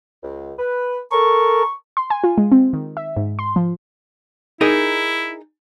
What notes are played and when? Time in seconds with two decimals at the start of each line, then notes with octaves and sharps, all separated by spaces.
0.23 C#2
0.59 B4
1.12 A4 A#4 C#6
1.97 C6
2.10 G#5
2.24 F4
2.38 G#3
2.52 C4
2.73 D#3
2.97 E5
3.17 G#2
3.39 C6
3.56 F3
4.61 D#4 E4 G#4 A#4